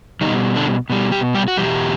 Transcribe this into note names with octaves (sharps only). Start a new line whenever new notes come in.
B2 D#3 G3 D#4
D3 D4
B2 G3
G3 G4
G3 G4
F#4
E2 B2 G3 G4